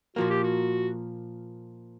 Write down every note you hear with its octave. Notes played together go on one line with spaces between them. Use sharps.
A#2 F3 A#3 F#4
G4
F#4